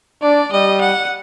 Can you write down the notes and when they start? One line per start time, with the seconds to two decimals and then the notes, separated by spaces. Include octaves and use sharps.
0.22 D4 D5
0.52 G3 D#5
0.81 F#5